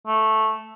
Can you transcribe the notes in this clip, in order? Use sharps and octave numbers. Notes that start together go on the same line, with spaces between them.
A3